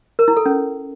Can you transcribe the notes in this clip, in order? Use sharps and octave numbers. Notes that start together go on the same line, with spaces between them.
A#4
E4
A4
C#4